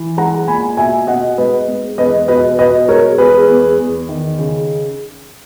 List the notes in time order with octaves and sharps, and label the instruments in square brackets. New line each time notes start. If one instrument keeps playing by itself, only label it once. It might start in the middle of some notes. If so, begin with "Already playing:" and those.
Already playing: [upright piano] E3
G#3 F#5 A#5
A#2 G#5 B5
B2 E5 G#5
B2 D#5 F#5
G#2 B4 D#5
G#2
E2 B4 D#5
B2 B4 D#5
B2 B4 D#5
G#3 A#4 C#5
E2 G#4 B4
E2
E2
D#3
C#3